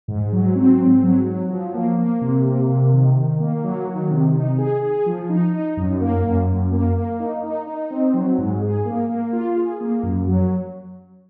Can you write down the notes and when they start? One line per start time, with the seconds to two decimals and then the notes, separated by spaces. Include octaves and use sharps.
0.08 G#2
0.32 F#3
0.56 C4
0.80 G#2
1.03 F#3
1.27 F#3
1.51 F3
1.74 A#3
1.98 A#3
2.21 C3
2.45 A#3
2.69 C3
2.93 D#3
3.16 D#3
3.40 A#3
3.64 F#3
3.88 D#3
4.11 C3
4.35 D#4
4.58 G#4
4.82 G#4
5.06 F3
5.29 D#4
5.54 D#4
5.77 F#2
6.01 A#3
6.24 F#2
6.49 F#2
6.72 A#3
6.96 A#3
7.20 D#4
7.43 D#4
7.67 D#4
7.91 C4
8.14 F#3
8.38 G#2
8.62 G#4
8.85 A#3
9.09 A#3
9.33 F4
9.56 G#4
9.80 A#3
10.03 F#2
10.28 F#3